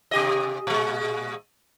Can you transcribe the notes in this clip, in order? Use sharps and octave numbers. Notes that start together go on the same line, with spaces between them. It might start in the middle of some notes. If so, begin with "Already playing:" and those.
C3 G4 D#5
A#2 G#3